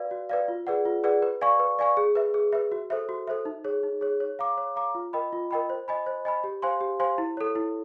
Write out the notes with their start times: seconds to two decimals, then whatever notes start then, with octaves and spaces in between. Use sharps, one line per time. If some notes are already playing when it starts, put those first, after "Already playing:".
Already playing: F#4 B4 D5 F5
0.11 F#4
0.29 B4 D5 F5
0.48 F4
0.67 G#4 B4 D5 F#5
0.85 F4
1.04 G#4 B4 D5 F#5
1.22 B4
1.41 D5 F5 G#5 C#6
1.59 B4
1.79 D5 F5 G#5 C#6
1.97 G#4
2.15 B4 E5
2.34 G#4
2.52 B4 E5
2.72 F#4
2.90 A4 C5 E5
3.09 F#4
3.28 A4 C5 E5
3.45 D#4
3.64 G#4 C#5
3.83 D#4
4.01 G#4 C#5
4.20 C#5
4.39 F5 A#5 D6
4.57 C#5
4.76 F5 A#5 D6
4.95 F4
5.13 A#4 D#5 G5 B5
5.33 F4
5.51 A#4 D#5 G5 B5
5.70 C5
5.88 D#5 G#5 B5
6.06 C5
6.25 D#5 G#5 B5
6.44 G4
6.62 C5 F5 G#5 C6
6.81 G4
7.00 C5 F5 G#5 C6
7.18 E4
7.37 A4 C#5
7.55 E4